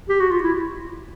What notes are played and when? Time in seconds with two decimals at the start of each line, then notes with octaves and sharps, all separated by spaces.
0.09 G4
0.20 F#4
0.31 F4
0.42 E4